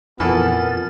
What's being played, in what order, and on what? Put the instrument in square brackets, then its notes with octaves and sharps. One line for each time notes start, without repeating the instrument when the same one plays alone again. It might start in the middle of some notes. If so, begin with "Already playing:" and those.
[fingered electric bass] F2 [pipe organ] A#2 A#4 A6 [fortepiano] E3 A4 [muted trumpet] B3